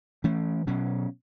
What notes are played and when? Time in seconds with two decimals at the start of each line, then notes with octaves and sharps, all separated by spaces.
0.24 E3 A3 C#4
0.67 B2 F#3 C#4